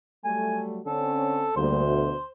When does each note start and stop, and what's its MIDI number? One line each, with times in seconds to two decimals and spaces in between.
0.25 0.81 54
0.25 0.81 55
0.25 0.81 57
0.25 0.63 80
0.86 1.49 50
0.86 1.49 60
0.86 1.49 61
0.86 1.54 69
1.56 2.13 38
1.56 1.84 55
1.56 1.84 58
1.56 2.31 72
1.86 2.14 47